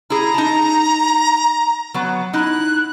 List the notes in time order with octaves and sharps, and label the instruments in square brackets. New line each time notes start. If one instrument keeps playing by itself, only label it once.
[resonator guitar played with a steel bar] E4 G#4 [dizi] A#5
[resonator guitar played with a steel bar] D#4 A5
F#3 B3
[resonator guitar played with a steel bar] D#4 E4 [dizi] F#6